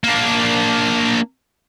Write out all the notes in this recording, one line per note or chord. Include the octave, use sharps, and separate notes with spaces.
A#3 D4